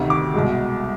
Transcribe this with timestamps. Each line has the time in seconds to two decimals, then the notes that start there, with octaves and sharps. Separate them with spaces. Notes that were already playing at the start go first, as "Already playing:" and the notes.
Already playing: D2 C3 D#3
0.10 D6
0.34 C2 B2 G#3